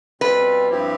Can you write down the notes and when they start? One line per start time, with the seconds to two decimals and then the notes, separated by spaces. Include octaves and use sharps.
0.21 B2 G3 C4 F4 B4
0.69 G2 F3 C4 E4 G4